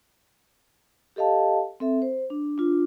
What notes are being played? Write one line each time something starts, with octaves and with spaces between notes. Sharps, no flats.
G4 A4 D#5 F5 A5
C4 A4 E5
C5
D4
D4 F4